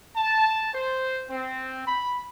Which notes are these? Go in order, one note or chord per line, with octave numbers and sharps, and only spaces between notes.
A5
C5
C4
B5